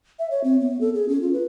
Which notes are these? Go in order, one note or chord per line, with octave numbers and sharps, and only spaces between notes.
E5
C#5
C4
B3
A4
G#4
C#4
F4
B4